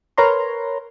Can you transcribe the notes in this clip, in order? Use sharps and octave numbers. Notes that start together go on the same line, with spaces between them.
A#4 B4 C#5 A#5 C6